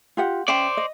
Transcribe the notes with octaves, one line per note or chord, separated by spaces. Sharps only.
F4 G4 F#5
C#4 C5 D5 E5 G5
D#5